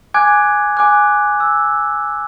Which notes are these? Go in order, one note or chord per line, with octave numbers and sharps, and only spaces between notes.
G#5 D6 F#6 G#6
G#5 D6 F#6
E6